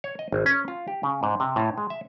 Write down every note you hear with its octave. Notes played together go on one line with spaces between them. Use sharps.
C#5
D#5
G#1
C#4
F4
G4
C#3
G#2
C3
A2
G#3
E5